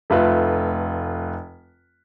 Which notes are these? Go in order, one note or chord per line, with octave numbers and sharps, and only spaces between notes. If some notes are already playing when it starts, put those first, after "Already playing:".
F1 A3 F4 B4